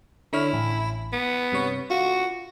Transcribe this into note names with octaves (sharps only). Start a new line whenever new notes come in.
D3 E4 C#5 F6
A1
B3
G2 C3 C#5
F4 F#4